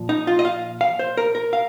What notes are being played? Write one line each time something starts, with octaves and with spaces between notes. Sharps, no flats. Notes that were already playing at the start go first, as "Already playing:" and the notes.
Already playing: A#2 F3
D#4
F4
D#5
F5
F5
C5
A#4
A#4
F5